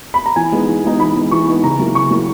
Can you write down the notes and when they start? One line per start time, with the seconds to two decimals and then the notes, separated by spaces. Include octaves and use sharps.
0.14 B5
0.26 A#5
0.36 E3 G#5
0.52 G#3 B3 D#4
0.68 E3
0.84 G#3 B3 D#4
1.00 E3 B5
1.16 G#3 B3 D#4
1.31 E3 C#6
1.47 G#3 B3 D#4
1.63 C#3 A#5
1.79 F#3 A#3 E4
1.95 C#3 C#6
2.11 F#3 A#3 E4